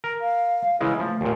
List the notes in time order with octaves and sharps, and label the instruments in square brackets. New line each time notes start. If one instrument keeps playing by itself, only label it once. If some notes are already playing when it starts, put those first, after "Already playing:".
[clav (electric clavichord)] A#4
[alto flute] F5
[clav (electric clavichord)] C#3 E3 G#3 [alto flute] E4
[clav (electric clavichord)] F3 [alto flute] A3
[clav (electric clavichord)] D#2 A#2